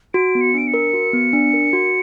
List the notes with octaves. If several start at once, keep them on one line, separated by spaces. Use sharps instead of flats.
F#4 D7
B3
C#7
D4 D7
C#7
A#4
F#4
B3
D4
A#4
F#4